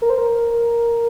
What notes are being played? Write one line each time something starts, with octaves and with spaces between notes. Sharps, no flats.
A#4
C5
A#4